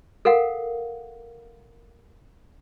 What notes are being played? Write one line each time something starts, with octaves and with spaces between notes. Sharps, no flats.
A4 A#4 F5 F#5